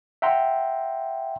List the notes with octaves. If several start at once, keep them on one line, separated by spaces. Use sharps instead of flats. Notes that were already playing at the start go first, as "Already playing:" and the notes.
E5 F#5 G5 A#5 C6